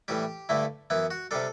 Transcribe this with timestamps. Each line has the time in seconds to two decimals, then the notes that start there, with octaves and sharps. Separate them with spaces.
0.08 A2 E3 G3 G4
0.49 G2 D3 A3 E4
0.90 F#2 E3 B3 E4
1.10 F#4
1.31 C3 G3 D4 A4